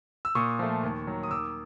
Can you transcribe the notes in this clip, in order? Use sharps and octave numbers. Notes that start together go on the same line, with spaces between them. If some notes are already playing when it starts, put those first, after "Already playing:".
E6
A#2 C#6 D#6
F3 A3
D#2
D#3 F#3
D#6
D#2 D6 E6